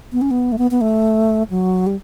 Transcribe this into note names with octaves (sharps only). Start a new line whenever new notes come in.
B3
C#4
B3
A3
B3
B3
A3
F#3
G3